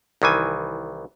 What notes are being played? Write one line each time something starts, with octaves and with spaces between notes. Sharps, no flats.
C2 D#3 E3 G#5